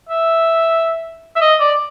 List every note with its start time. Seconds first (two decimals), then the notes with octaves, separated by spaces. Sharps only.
0.09 E5
1.36 E5
1.42 D#5
1.60 D5